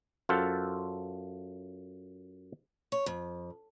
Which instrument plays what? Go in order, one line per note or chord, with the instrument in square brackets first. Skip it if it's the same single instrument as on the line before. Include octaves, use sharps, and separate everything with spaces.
[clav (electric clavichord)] F#2 F4 A4 C5 F#5
[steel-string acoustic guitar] C#5
F2